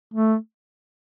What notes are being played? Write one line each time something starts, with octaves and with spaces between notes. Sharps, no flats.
A3